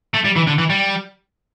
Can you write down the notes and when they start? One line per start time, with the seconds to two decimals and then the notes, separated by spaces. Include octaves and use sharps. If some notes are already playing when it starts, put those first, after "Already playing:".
0.14 A3
0.25 G3
0.36 E3
0.47 D3
0.58 E3
0.70 G3